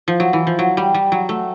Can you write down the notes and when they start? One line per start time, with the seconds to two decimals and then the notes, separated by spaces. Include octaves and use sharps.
0.08 F3
0.20 F#3
0.33 E3
0.47 F3
0.59 F#3
0.77 G3
0.94 G3
1.12 F#3
1.29 A3